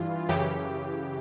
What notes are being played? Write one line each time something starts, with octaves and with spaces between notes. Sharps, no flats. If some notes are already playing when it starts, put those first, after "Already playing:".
Already playing: G2 E3 F4
F#2 C#3 E3 G4